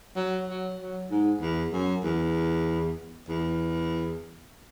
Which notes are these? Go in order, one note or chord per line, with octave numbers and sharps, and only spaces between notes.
F#3
F#3
F#3
G#2
E2
F#2
E2
E2